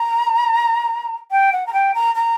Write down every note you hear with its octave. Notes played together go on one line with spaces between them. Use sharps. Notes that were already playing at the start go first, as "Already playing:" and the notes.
Already playing: A#5
G5
F#5
A#5
G5
A#5
A#5